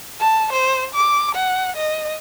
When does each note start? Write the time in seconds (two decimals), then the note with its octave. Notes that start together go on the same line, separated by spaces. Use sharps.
0.20 A5
0.53 C5
0.94 D6
1.35 F#5
1.76 D#5